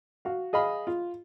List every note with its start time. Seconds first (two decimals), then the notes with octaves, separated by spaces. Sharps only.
0.25 F#4 F5
0.53 G#4 D#5 F5 B5
0.87 F4